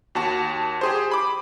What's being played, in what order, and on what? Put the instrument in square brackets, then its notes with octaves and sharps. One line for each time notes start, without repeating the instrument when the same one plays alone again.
[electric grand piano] D#2 F#4 A5
G4 G#4 C5
B5 D6